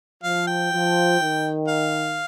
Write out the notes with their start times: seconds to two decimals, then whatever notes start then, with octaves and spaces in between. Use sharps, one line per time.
0.23 F3 F5
0.47 G5
0.72 F3
1.20 D#3
1.68 F5